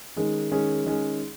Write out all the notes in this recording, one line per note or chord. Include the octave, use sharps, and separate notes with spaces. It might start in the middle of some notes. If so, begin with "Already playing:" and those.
D#3 G#3 C#4 G#4
D#3 G#3 C#4 G#4
D#3 G#3 C#4 G#4